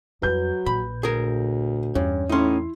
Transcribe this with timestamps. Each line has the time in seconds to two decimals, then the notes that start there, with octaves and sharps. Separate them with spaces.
0.22 F2 F#3 G3 B4 G6
0.66 A#1 A#2 B5
1.03 D2 G#4 A#4
1.95 E2 G2 C#4
2.29 A2 C#4 D#4 E4 C6